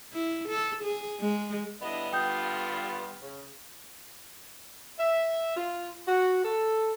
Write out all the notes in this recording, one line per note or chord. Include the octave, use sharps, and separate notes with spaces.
E4
A4
G#4
G#3
D3 G3 B3 D4 E4 D#5
G2 F4 G5 D#6 G6
C#3
E5
F4
F#4
A4